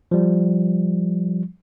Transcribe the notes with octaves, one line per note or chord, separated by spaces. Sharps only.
F3 G3